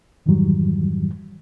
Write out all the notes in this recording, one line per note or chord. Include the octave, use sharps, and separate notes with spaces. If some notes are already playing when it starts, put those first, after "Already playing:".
F2 G#2 D#3 E3 F#3 G3